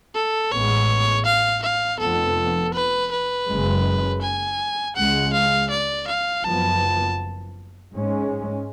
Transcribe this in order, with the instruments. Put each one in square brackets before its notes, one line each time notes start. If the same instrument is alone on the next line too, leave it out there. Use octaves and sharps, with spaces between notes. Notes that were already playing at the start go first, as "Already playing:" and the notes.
[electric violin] A4
[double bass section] A1 A2 G#3 B3 [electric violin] C#5
[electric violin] F5
F5
[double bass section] F1 F2 F3 B3 [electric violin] A4
[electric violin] B4
B4
[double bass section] F#1 F#2 C#3 G#3
[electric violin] G#5
[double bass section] C#2 C#3 G#3 [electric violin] F#5
[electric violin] F5
D5
F5
[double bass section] F#1 F#2 F3 B3 [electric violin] A5
[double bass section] G#2 G#3 C#4